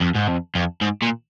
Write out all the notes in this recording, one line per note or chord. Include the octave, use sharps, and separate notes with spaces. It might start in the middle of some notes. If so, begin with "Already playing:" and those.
F2
G#2
F2
F2
G#2
A#2